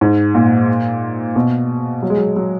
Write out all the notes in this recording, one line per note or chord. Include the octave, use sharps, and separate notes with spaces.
G#2
A#2
B2
F#3
G#3
F#3
F#3